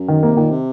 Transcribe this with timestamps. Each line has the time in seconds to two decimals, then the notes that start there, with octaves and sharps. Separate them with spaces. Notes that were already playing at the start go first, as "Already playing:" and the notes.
Already playing: F#2
0.08 D#3
0.23 C3 A#3
0.36 A#2 D#3
0.51 C3